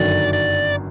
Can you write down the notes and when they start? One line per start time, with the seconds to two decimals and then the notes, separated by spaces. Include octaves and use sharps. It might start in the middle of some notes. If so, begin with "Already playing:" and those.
Already playing: G1 F#2 D#3 F#3 D5
0.33 D5